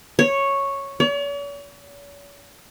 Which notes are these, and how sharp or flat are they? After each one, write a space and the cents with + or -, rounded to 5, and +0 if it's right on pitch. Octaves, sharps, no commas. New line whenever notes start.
C#5 -5
C#5 +45